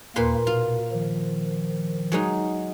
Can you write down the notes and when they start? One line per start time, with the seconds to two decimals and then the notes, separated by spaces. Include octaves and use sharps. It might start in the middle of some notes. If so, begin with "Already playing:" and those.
0.16 D#2 A#2 A#3 B4 C6
0.47 B2 F4
0.91 D#3 F3
2.12 F#3 G#3 D#4